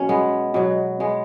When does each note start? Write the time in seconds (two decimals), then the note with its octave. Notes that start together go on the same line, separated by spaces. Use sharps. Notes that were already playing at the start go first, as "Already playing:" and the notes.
Already playing: B2 F#3 C#4
0.09 G#3 B3
0.54 B2 F#3
1.00 G#3 B3